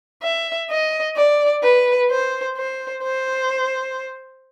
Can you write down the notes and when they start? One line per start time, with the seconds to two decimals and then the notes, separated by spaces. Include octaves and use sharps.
0.23 E5
0.70 D#5
1.16 D5
1.63 B4
2.11 C5
2.57 C5
3.03 C5